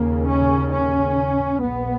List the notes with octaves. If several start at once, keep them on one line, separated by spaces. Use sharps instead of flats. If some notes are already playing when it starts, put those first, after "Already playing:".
Already playing: D#2 C#3 A#3
C#4
C#4
A#1 A#2 B3